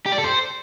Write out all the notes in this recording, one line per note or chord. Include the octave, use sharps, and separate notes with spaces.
G4
D5
A4
C5